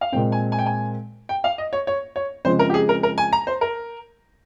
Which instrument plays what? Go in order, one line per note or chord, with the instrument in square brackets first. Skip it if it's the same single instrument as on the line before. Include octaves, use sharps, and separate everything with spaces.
[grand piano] F5
[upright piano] A#2 G#3 C4 [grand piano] G5
[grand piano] G#5
G#5
G5
G#5
G5
F5
D#5
C#5
C#5
C#5
[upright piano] C#3 F3 G#3 C4 [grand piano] C5
[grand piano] A#4
G4
G#4
A#4
A#4
G#5
A#5
C5
A#4